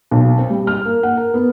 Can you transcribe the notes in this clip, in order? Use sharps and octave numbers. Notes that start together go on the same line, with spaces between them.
B1
C4
G3
F6
A#3
F#5
A#4
B3